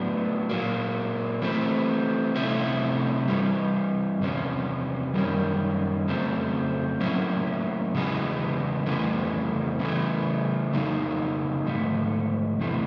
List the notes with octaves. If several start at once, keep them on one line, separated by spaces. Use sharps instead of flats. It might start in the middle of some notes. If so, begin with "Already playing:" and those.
Already playing: A2 F#3 B3 D4
A#2 F#3 A#3
E3 A3 C4
C3 F3 A3 C#4 E4
G2 E3 G3
E2 C3 F3 C#4
F#2 D#3 G3 A#3 C#4
F2 C#3 F#3 A3 C4
A2 F#3 A#3 C#4 E4
E2 C#3 E3 G#3
F2 C#3 E3 A3
C#3 E3 A3
F2 C#3 F#3 A#3 D#4
G#2 F3 A3
E2 C3 E3 A3